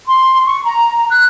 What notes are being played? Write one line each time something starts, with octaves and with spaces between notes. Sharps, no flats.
C6
C#6
A#5
F#6